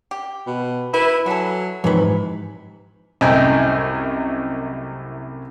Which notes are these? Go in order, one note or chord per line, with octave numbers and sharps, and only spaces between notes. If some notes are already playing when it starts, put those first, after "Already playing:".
G4
B2
E4 B4
E3 F#3 A4
G#2 C3 E3 F3 B4 C#5
C2 F#2 A2 D#5 G5 G#5